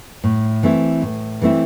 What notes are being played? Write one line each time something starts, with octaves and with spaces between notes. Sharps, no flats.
A2
E3 A3 C4 E4
A2
E3 A3 C4 E4